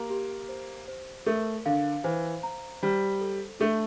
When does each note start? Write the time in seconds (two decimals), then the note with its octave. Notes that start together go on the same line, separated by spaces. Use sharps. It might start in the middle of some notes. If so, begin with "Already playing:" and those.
Already playing: A#3 G4
0.10 G4
0.49 C5
0.88 C5
1.26 A3 A#4
1.65 D3 F5
2.04 E3 C5
2.43 A#5
2.83 G3 C5
3.21 A4
3.60 A3 D4